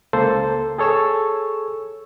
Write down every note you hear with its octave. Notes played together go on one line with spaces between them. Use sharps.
C#2 A#3 A4 C5
G#4 A4 C#5 C#6 E6